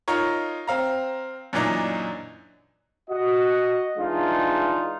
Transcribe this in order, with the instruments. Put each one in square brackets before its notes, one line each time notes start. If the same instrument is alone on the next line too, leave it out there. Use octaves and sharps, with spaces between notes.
[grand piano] D#4 F4 A#4 C#5
C4 F5 A#5
F#2 A#2 E3 D4 D#4
[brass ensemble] F#4 D#5
E3 G#3 D4 D#4 F4